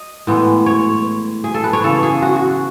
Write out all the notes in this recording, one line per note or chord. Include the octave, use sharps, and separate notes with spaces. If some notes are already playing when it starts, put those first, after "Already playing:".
Already playing: D#5
A2 E3 G#3 B3
C#5
G#4
A4
B4
C#5
C#3 E3 B3 E4 A4
G#4
F#4
F#4